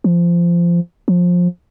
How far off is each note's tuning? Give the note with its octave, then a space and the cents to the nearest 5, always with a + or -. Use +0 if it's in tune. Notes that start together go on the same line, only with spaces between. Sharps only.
F3 -20
F3 +20